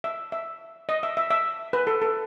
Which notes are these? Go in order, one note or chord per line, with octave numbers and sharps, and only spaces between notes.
E5
E5
D#5
E5
E5
E5
B4
A4
A4